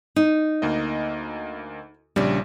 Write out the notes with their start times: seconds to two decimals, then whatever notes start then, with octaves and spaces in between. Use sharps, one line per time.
0.16 D#4
0.62 D2 A#3 D#5
2.16 A#1 C#3 G3 D4